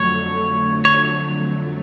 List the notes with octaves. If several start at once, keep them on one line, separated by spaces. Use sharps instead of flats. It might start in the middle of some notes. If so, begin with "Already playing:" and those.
Already playing: F2 D3 F#3 A3 C#5
C#5